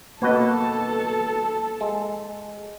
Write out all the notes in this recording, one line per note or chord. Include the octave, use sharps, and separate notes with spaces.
B2 A#3 F#4 A4 B4 D#5 A5
G#3